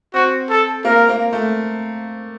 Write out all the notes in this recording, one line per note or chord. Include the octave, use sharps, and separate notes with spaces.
C4 F#4
A4
A#3 A#4
A#3
A3